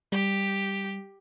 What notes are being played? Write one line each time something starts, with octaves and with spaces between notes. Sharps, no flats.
G3 G4